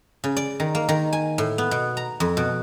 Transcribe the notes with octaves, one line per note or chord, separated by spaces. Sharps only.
C#3
D5
D#3
A#3
D#3
G#5
A2
B3
B2
A#5
F2
B2